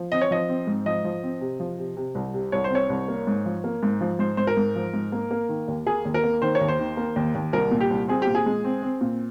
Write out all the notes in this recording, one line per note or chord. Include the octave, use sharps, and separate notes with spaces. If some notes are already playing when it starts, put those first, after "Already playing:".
Already playing: F3
C4 D#5
C#5
F3 D#5
C4
G#2
F3 D#5
F3
C4
C3
F3
C3
C3
C2
C3
C2 C#5
C5
C4 C#5
C2
A#3
G#2
F3
A#3
G#2
F3
G#2 C5
G#2 C5
A#4
G#2
F3
G#2
A#3
A#3
D#3
D#2
A#3 G#4
D#2
A#4
A#3
D#3 C5
C#5
D#2
C5
D#3
A#3
D#2
D#2
C2 A#4
A#2
G4
C2
C4 G#4
A#2 G4
G#4
G#3
C4
C4
A#2